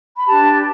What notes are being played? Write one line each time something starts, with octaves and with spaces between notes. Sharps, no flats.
B5
D4 G4 B4 A5